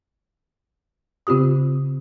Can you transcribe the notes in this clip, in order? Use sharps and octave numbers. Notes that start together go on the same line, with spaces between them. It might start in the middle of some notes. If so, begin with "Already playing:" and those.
C#3 C4 F4 G4 D#6